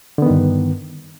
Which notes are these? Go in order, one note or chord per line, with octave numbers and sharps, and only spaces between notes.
G2 D3 D#3 B3